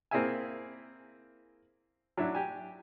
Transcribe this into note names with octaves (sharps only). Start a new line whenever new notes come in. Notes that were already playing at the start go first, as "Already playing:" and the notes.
A#3 C4 E4 G#4 E5 G#5
F#3 D4 E4
G4 G#5